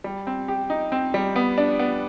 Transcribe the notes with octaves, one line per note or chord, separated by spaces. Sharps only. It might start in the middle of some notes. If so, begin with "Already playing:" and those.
G3
C4
G4
D#4
C4
G3
B3
D4
B3